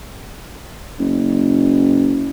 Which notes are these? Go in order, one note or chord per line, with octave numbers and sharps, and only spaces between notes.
F#1